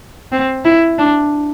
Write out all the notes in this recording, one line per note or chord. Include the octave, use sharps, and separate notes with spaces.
C4
E4
D4